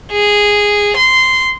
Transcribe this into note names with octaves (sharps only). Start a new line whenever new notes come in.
G#4
C6